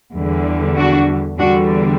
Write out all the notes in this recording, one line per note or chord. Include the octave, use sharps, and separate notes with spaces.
E2 D3 G3
D4 F#4
E2 D3 G3 D4 F#4